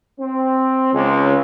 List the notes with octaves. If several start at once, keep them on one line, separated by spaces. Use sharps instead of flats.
C4
C#2